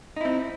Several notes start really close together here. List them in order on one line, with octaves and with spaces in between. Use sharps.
D#4 E4 C4